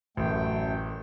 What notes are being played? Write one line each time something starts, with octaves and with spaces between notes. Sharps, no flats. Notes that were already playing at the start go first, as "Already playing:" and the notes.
A1 F#2 A3 G5